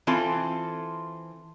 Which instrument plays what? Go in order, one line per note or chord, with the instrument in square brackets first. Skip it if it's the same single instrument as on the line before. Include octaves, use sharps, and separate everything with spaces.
[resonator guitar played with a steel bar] E3 C4 F4 A4